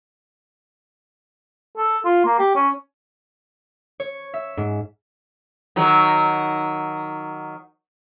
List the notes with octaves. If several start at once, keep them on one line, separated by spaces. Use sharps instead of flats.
A4
F4
A#3
G4
C#4
C#5
E5
G#2
D#3 F#3